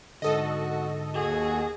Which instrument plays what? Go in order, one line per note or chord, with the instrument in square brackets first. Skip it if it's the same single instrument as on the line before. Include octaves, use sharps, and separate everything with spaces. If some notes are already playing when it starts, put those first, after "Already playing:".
[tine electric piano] G#2 D3 [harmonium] F#4 [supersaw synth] A4 D#5
[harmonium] D#2 F#4 [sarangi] G#4